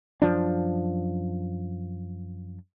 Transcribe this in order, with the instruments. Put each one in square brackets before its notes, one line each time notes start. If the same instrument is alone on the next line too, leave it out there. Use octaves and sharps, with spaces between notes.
[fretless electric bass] F#2 F3 D4